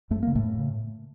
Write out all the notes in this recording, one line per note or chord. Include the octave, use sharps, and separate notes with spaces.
F#2 A3
C#3 A#3
A2 A3
F#2
C#3